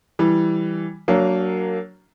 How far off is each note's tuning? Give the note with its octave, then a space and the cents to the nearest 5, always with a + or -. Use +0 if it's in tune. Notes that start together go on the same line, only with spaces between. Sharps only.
E3 +0 G3 +0
F#3 +10 A#3 -15 D4 -10